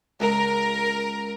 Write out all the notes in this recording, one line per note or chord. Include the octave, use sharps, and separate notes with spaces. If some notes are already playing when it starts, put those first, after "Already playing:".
C#2 A#4